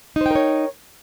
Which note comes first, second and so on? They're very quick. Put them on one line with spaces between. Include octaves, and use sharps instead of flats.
D#4 C5 G5 A#4 C#5